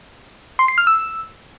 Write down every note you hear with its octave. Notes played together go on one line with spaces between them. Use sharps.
C6
C7
F6
E6